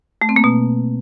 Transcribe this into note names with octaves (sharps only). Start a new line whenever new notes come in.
A3
C4
A#3
B2